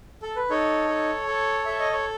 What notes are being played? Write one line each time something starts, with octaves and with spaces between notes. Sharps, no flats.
A4
B4
D#4 A4 C#5
A4
A4
A4 E5
D#5
C#5